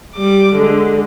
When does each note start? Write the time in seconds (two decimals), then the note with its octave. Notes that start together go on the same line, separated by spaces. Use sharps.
0.16 G3 D6
0.56 D3 G#3